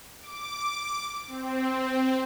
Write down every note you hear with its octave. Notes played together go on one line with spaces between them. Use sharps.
D6
C4